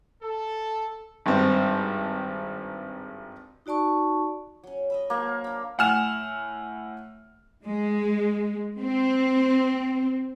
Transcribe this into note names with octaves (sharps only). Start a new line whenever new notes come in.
A4
G#1 G2 C4
D#4 F#4 D5 A5 C#6
F#3 C#4
D#5 E5 B5
F#3 A#3 C5
D4 B5
A2 F#5 G#5 F6 E7
G#3
C4